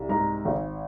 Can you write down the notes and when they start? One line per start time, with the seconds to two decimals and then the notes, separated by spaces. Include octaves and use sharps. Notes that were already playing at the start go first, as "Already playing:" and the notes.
Already playing: C2
0.09 G#2 A#5
0.45 G#1